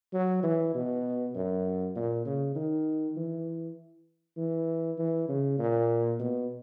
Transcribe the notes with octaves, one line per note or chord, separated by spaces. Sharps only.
F#3
E3
B2
F#2
A#2
C#3
D#3
E3
E3
E3
C#3
A#2
B2